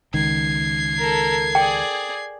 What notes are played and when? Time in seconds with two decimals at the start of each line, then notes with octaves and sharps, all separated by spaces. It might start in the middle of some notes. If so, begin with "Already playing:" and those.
0.14 C#2 D#3 G#6 C7
0.98 A4 A#4
1.55 G#4 D5 G5